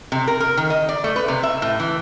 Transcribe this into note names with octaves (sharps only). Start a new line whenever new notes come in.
C3
A#4
A#4
D#3
D#5
D5
A3
B4
C3
E5
A2
E3